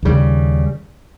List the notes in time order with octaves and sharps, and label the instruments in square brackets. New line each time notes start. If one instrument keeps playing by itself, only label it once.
[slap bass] D#2 C#3 G3